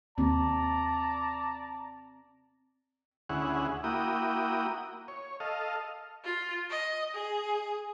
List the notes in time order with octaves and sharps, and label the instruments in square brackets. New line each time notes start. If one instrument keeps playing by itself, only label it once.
[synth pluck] D#2 [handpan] C4 [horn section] D5 A#5 [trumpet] A5
[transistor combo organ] D2 C#4 E4 G#4 F#5
A#3 E4 F#4 G5 D#6
C#5
A4 D#5 F5
[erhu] F4
D#5
G#4